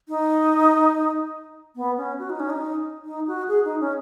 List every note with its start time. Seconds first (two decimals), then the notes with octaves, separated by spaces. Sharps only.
0.09 D#4
1.76 B3
1.98 C#4
2.19 F#4
2.30 D#4
2.40 C#4
2.50 D#4
3.05 D#4
3.27 F#4
3.48 G#4
3.65 D#4
3.81 C#4